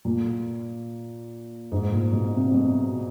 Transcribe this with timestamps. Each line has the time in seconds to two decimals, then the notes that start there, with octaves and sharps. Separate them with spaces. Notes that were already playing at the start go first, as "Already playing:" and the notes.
0.05 A#2
1.72 G#2
1.92 A#2
2.13 B2
2.34 C3
2.54 B2